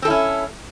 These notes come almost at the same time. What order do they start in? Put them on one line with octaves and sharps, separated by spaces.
C4 A4 E4 C#4